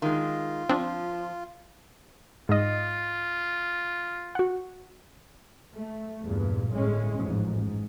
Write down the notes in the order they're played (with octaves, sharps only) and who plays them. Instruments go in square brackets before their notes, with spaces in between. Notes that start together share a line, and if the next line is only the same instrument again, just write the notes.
[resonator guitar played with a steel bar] D#3 G#3 [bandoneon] F4
[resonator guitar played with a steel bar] F3 [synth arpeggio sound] C4 D4
[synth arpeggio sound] G#2 D#5 [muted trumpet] F4
[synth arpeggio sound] F#4 F#5
[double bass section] A3
E2 G2 A#2
G1 A2 G#3 C#4
A1 F2 G#2
G#2